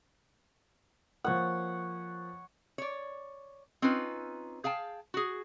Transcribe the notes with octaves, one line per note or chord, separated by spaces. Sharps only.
F3 A#3 C#5 F#5
C#5 D5
C4 C#4 D#4 F4 B4
G#4 F5 G5 A5
F#4 G#4